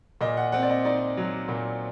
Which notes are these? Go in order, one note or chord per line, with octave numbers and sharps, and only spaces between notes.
A#2 D#5
F#5
C4 F#5
D5
D#5
D#4 D5
F#3
A#2